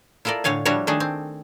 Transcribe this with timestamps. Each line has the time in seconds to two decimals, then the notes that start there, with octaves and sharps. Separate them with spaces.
0.25 E4 F4 A4 A#4 D5
0.44 A2 D3 C#5 F5 G#5
0.65 F3 G3 D4 E4 F#4 C#5
0.87 D#3 A3 D4 G#4 A4
1.00 C4